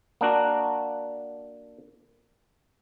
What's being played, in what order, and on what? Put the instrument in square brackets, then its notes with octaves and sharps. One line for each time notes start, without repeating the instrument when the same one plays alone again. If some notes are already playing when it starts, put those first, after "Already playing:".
[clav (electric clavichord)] A#3 D4 F#4